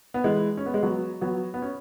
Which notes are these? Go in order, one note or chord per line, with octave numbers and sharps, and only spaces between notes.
B3
E3 G#3
C#4
B3
G#3
F#3 B3
F#3 B3
B3
C#4